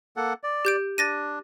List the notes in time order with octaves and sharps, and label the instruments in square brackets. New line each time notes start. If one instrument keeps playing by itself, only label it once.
[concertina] A#3 A4 F#5
D5
[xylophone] G4 G6 D7
[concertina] D4 [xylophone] A6 A#6 D#7